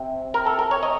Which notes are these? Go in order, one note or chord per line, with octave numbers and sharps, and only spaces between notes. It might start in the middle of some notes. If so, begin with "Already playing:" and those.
Already playing: C3 C4
A#4
A4
A#4
C#5
D#5